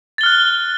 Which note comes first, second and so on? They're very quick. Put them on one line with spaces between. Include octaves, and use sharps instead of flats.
A6 G7 F6 F#6